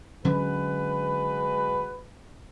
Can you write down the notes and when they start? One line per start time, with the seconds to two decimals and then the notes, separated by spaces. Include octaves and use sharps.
0.25 D3 F#3 G#3 C#4 F#4 B4